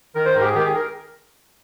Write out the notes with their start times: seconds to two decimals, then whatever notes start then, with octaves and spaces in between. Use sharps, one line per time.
0.15 D#3 A#4
0.25 C5
0.35 G#2 A#4
0.41 G4
0.45 G#4
0.55 D#3 G4
0.65 G#4
0.75 A#4